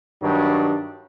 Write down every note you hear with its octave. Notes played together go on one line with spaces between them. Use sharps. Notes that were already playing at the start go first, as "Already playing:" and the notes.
G2 D#3 F#3 G3 D4